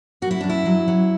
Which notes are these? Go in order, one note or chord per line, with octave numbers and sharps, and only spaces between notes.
F#2 F#4
E4
F#2 D4
E4
F#3
F#3